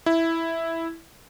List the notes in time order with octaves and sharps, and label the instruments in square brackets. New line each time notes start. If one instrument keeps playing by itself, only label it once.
[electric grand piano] E4